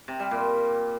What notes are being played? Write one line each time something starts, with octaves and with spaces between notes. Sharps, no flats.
C3
G3
A#2